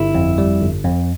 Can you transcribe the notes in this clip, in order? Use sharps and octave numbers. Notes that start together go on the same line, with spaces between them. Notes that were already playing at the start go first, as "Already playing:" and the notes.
Already playing: G1 E4
F2
G3
G1
F2